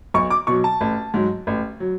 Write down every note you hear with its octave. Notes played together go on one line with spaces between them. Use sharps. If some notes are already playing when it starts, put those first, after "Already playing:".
B1 C#6
D6
B2 F#3 C#6
A5
A1
G#2 F#3
A1
F#3